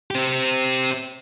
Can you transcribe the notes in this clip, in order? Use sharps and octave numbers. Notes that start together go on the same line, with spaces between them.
C4 G4